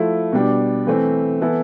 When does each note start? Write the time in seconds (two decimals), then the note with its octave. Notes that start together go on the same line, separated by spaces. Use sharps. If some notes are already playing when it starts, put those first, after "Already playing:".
Already playing: F3 A3 E4 A4
0.32 B2 G3 D4 G4
0.87 E3 A3 C4
1.41 E3 B3 E4 A4